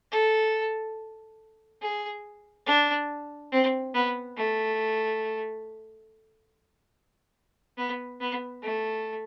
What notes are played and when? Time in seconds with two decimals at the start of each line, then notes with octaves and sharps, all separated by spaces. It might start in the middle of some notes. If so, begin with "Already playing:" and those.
0.11 A4
1.82 G#4
2.67 D4
3.52 C4
3.94 B3
4.37 A3
7.78 B3
8.20 B3
8.63 A3